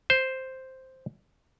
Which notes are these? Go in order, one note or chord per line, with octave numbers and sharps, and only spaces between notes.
C5